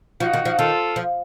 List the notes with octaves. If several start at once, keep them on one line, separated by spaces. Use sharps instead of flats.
F3 D#4 F#4
D#3
F3
D#3 F4 A4
F3